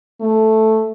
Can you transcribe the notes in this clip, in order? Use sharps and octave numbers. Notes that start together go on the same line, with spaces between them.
A3